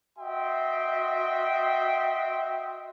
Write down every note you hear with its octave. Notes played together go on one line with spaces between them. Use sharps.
F#4 D#5 E5 G5 C6